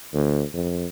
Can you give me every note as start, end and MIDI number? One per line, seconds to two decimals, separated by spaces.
0.14 0.43 38
0.54 0.86 41